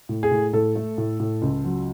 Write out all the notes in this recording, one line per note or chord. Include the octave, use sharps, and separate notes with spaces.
A2
G#4
A2
A2 A4
A3
A2
A2
C#2
F#3